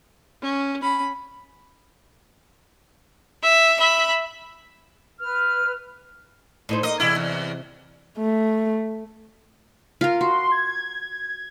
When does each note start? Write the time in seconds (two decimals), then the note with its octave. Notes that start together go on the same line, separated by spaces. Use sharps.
0.42 C#4
0.82 C#4 B5
3.43 E5
3.79 E5 B5
5.20 B4 F6
6.69 A2 D#4 C5
6.83 A#3 D#4 D#5
7.00 E2 C3 E4 E5
7.16 E2
8.17 A3
10.01 F4 A#4
10.21 F#4 C6
10.51 G#6